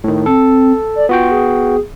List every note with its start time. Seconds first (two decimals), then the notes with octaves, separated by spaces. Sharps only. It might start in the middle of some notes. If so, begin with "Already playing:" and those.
0.04 A2 D#3
0.26 C4 A4
0.95 D5
1.09 B3 F4 F#4 G5
1.31 G#4